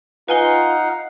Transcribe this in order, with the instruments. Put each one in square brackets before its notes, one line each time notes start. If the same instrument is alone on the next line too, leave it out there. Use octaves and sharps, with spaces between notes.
[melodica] D#4 F5 F#5 [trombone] F4 [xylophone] B4 G#5 G7